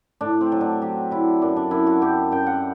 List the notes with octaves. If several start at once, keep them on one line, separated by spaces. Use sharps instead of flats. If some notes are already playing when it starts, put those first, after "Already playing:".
A2 D4
C4
F#3
D4
F#3 G4
F#3 E4
F#2 D4
D4
F#2 E4
F#4
F#2 G4
F#2 G5
F#5